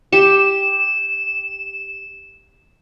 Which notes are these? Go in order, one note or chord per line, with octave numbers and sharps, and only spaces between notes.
G4 E7